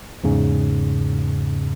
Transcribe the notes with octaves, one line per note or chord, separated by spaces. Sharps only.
E2 G#2 C#3